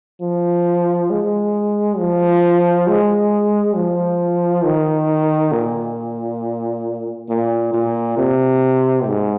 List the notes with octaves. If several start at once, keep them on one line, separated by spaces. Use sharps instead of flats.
F3
G#3
F3
G#3
F3
D#3
A#2
A#2
A#2
C3
G#2